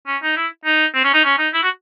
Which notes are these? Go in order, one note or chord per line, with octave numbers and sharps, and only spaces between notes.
C#4
D#4
E4
D#4
C4
C#4
D#4
C#4
D#4
E4
F#4